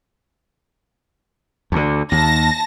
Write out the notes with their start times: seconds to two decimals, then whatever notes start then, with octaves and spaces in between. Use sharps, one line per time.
1.72 D2 D3
2.12 D#2 A5 A#6